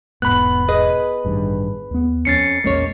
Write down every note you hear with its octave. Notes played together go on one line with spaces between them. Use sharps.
E1 G#2 B3 B5 F#6
G#4 B4 D#5
A1 G2 D#3
D#2 B3
F2 C#4 A6 C7 C#7
A#1 E2 G#3 A#3 C#4 C#5